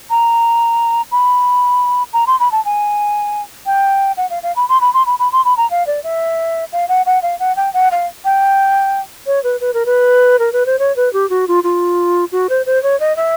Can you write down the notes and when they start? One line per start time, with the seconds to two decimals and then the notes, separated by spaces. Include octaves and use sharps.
0.10 A#5
1.12 B5
2.13 A#5
2.27 C6
2.40 B5
2.52 A5
2.65 G#5
3.66 G5
4.17 F#5
4.30 F5
4.43 F5
4.56 B5
4.69 C6
4.81 B5
4.94 C6
5.06 B5
5.19 B5
5.32 C6
5.45 B5
5.57 A#5
5.71 F5
5.87 D5
6.04 E5
6.73 F5
6.89 F#5
7.06 F#5
7.22 F5
7.40 F#5
7.57 G5
7.74 F#5
7.91 F5
8.25 G5
9.26 C#5
9.44 B4
9.61 B4
9.74 A#4
9.86 B4
10.39 A#4
10.53 B4
10.66 C5
10.79 C#5
10.96 B4
11.13 G4
11.30 F#4
11.48 F4
11.64 F4
12.32 F#4
12.49 C5
12.66 C5
12.83 C#5
13.00 D#5
13.17 E5